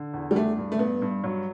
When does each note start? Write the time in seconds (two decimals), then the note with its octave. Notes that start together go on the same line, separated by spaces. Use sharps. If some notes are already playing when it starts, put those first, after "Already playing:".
Already playing: D3
0.14 E2
0.31 G3
0.35 A3 D4
0.58 G2
0.72 A3
0.79 G2 B3
1.02 G2
1.24 F#3